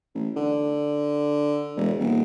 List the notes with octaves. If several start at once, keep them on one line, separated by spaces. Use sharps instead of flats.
A1
D3
E1
D#1